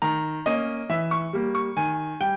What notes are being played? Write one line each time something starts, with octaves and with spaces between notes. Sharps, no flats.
D#3 A#5
A#3 C#4 D#5
E3 E5
C#6
G3 A#3
C#6
D#3 G#5
G3 G5